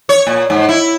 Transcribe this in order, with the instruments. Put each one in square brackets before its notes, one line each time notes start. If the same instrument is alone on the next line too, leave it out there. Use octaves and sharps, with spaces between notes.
[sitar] C#5
A#2
G#2
E4